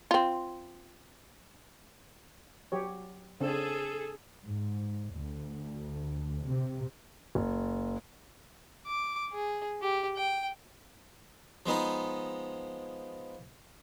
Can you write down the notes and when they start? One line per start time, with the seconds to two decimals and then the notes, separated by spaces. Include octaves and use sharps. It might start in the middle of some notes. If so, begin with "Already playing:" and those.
0.11 C4 F4
2.72 F#3 G4 C#5
3.41 C#3 C4 D4 G#4 A4
4.45 G#2
5.15 D2
6.45 C3
7.35 F#1
8.87 D6
9.33 G#4
9.82 G4
10.17 G5
11.66 F3 G#3 B3 D#4